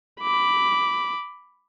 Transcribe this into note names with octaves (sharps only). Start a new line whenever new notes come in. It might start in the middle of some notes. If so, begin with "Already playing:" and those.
B5 D6